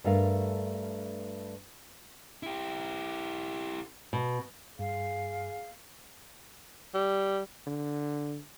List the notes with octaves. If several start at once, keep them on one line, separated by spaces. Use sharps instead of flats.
G2 A3 A#4 F5
E4 G4
B2
G2 G#4 F5
G3
D3